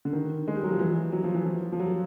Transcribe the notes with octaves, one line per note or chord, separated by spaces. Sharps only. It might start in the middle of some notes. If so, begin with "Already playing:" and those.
D3
D#3
G#3
G3
F#3
F3
E3
F#3
F3
E3
F3
F3
F#3